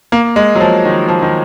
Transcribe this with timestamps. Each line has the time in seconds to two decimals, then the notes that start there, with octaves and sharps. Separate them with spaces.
0.12 A#3
0.36 G#3
0.55 F#3
0.61 F3
0.86 D#3
1.08 F3
1.22 D#3